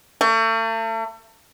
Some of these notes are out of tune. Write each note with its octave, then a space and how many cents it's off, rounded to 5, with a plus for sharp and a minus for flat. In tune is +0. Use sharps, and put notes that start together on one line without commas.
A3 +40